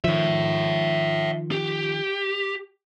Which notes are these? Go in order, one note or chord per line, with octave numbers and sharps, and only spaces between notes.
D#3 F3 C#5 E5
G4